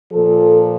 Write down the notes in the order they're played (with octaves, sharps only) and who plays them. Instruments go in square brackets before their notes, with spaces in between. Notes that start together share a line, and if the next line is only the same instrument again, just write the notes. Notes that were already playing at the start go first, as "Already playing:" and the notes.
[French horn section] A#2 F3 A4